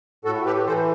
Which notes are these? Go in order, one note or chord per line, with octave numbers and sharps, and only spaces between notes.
A2 F#4 A4
G4 B4
E3 A4 C5